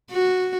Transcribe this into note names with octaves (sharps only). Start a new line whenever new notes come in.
F#4